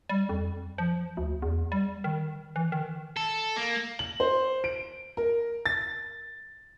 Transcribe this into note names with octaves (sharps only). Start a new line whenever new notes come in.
G3
F2
F3
D2
E2
G3
D#3
E3
D#3
A4
A#3
F#7
C5
D7
A#4
A6